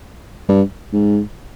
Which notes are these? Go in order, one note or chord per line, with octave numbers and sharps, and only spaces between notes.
G2
G#2